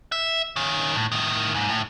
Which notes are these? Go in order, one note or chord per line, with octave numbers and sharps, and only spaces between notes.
E5
D#3 C#4
A2
A2 D#3
D#2 G#2
A2